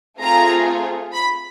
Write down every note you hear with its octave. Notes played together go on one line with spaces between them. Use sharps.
A3 C4 F4 G#4 A#5
B5